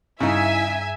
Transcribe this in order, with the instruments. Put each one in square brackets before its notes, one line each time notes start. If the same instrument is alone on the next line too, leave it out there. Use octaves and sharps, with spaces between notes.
[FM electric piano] G2 G#4 A#5 [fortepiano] C#3 D#4 [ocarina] E4 [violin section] E5 G#5